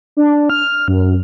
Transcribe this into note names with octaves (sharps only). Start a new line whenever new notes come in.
D4
F6
F#2